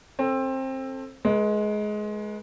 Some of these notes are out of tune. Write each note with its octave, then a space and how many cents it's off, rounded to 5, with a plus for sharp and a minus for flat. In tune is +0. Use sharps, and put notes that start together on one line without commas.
C4 +20 A4 +0
G#3 +20 B4 -35